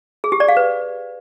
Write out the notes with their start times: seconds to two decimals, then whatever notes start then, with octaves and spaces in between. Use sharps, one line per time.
0.24 G#4
0.32 G4
0.40 D5
0.48 F5
0.57 B4